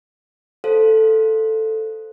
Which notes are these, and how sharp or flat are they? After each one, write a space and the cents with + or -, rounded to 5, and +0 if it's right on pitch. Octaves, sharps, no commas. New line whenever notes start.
A4 +0 C5 +0 F5 +0